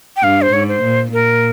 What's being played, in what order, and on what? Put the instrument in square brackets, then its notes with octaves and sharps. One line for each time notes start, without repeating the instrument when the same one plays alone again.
[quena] G5
[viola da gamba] G2 [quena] F5
[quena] C5
[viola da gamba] G#2 [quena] C#5
[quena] C5
[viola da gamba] A#2
[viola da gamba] A#2 [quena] A#4